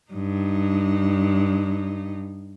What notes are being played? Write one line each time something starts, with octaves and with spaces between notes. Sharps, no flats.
G2 D#4